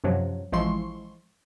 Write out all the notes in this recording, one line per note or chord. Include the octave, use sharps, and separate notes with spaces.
F#2 C3 F3 F#3
A1 F3 G#3 E4 C6 C#6